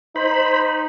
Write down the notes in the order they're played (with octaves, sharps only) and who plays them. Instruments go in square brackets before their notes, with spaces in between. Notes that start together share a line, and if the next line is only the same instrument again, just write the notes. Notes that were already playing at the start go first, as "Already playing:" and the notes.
[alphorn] D#4 [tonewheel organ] C5 B5